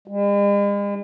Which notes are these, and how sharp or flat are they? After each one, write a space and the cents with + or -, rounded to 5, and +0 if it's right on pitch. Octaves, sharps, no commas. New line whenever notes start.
G#3 -45